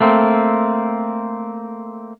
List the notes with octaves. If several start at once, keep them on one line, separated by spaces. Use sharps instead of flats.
A3 A#3 C4